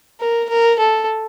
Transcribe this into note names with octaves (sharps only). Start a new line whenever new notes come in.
A#4
A#4
A4